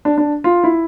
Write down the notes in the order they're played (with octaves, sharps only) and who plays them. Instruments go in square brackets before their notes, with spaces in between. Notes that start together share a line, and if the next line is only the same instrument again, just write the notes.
[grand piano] D4
D4
F4
E4